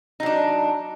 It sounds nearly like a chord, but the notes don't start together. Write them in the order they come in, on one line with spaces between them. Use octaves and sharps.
D#4 F#3 D4